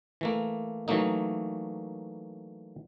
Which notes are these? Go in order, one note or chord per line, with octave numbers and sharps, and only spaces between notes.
E3 A3 A#3
E3 F#3 A3 A#3 D#4